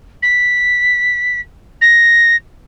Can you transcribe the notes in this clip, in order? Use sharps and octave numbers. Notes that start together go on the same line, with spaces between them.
B6
A#6